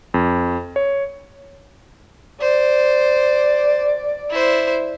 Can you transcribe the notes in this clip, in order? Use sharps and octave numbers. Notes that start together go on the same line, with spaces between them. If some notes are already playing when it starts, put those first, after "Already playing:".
F2
C#5
C5 D5
E4 C5